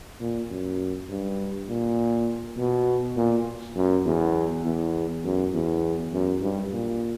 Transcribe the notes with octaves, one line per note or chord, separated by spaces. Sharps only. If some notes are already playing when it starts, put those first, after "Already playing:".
A#2
F#2
G2
A#2
B2
A#2
F#2
E2
E2
F#2
E2
F#2
G2
A#2